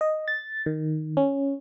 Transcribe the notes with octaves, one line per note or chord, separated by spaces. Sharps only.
D#5
A6
D#3
C#4